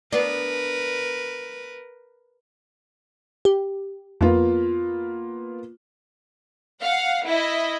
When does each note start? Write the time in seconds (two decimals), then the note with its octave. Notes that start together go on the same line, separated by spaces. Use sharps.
0.13 B3 D4 A#4 B4
3.45 G4
4.21 F2 A#3 B3 F4
6.82 F5 F#5
7.26 E4 D#5